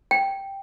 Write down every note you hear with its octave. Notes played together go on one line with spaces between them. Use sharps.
G5